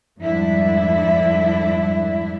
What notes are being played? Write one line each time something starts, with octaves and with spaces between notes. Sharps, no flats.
F2 G#2 D3 G3 D4 E4